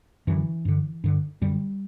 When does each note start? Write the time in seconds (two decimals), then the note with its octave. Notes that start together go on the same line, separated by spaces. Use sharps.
0.27 F#2 D3 E3
0.65 G2 D3
1.04 G2 D3
1.41 F#2 D3 G3